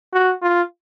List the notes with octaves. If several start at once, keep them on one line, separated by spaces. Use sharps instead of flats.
F#4
F4